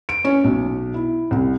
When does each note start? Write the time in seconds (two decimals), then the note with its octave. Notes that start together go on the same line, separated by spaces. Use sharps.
0.09 D7
0.25 C#4
0.44 B1
0.94 E4
1.31 C2